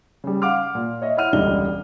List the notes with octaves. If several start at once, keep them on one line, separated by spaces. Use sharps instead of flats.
C#3 G3
F5 F#5 D6 F6
A#2
C#5 D#5 E5
E4 C#5 F#5 F6 D#7
E1 C#2 D3 G3 D#5 G7